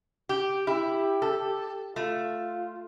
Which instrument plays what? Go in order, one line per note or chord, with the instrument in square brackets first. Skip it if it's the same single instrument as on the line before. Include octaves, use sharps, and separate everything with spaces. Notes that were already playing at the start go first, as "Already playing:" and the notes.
[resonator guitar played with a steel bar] G4
[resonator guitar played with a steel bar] E4 [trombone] G4
[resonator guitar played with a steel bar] A4
[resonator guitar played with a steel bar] A3 [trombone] F4